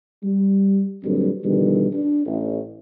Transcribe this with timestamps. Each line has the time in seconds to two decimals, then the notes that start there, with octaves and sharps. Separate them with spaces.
0.23 G3
1.04 G2 A#2 D3 F#3 G3 C4
1.43 B2 D3 D#3 F3 G3
1.92 D4
2.26 A1